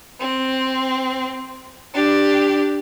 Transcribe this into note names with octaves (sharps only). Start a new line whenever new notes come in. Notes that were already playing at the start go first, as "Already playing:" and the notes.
C4
D4 G4